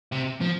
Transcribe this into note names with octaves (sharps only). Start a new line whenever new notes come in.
C3
F3